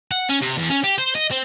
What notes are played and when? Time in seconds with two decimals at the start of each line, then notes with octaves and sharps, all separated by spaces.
0.11 F#5
0.29 C#4
0.42 C3
0.57 E2
0.70 C#4
0.84 G4
0.98 C5
1.15 D#5
1.31 C4